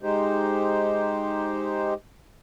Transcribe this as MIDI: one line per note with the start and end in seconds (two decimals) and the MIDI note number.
0.03 1.94 56
0.03 1.94 63
0.03 1.94 67
0.03 1.94 72